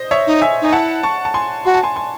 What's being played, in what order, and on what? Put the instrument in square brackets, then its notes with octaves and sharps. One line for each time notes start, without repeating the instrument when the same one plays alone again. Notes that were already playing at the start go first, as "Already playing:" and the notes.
Already playing: [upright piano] C5 D#5
C#5 E5
[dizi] D#4
[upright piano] E5 G#5
[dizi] D#4 [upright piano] G#5
[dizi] E4 [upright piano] F#5 A5
[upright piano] A5 C#6
A5
G#5 C6
[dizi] F#4 [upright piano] C6
[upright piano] A5
G#5 C6
G#5 C6